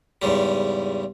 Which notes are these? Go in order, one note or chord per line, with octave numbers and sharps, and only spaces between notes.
E2 G#2 C#3 G3